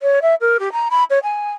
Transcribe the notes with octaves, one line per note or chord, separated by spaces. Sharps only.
C#5
E5
A#4
G4
A#5
B5
C#5
G#5